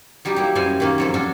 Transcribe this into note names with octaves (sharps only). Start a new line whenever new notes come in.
F#3 G3 D#4 G4
A#3 E4 G4
F#2 G3 F#4 C5 D5 G#5
D#3 A#3 C#4
F2 F#3 A4
C#4 D4 F#4 A4